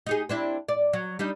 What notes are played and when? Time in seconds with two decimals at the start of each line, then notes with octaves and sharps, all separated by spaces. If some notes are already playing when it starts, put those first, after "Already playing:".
0.07 D#4 G4 G#4
0.29 C4 D4 E4
0.69 D5
0.93 F#3
1.19 G3 D4 D#4